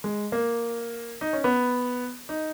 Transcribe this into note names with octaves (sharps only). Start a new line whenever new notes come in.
G#3
A#3
D#4
C#4
B3
D#4